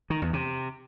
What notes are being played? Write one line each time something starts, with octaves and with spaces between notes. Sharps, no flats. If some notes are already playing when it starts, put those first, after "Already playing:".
D#3
E2
C3